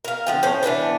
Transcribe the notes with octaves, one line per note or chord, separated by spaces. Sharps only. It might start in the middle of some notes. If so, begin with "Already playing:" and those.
A#4 F5
D3 F3 G5
A2 C#4 C5
E3 G3 B3 D4